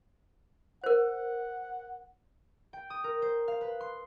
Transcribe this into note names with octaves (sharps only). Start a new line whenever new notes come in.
A#4 C5 F#5
G5
D#6
A#4
C5
F5
B4
C6